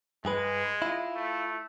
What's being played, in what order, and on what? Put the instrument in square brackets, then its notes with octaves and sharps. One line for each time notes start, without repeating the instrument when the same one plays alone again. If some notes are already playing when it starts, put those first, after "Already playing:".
[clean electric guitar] G2 G#4 B4 [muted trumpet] G#3
[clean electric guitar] E4 F4
[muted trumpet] A3